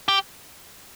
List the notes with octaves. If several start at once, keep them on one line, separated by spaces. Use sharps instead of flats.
G4